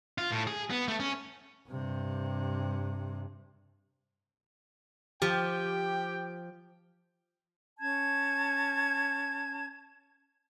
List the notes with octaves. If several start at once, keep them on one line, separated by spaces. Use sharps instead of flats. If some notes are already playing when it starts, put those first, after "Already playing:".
F4
A2
G#4
B3
A3
C#4
G2 C3
F3 G4 G5
C#4 A5 G#6